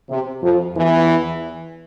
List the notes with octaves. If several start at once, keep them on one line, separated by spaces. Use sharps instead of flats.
C3
F2 F3
E2 E3